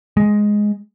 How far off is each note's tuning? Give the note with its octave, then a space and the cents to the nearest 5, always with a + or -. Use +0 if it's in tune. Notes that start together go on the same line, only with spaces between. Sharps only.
G#3 +0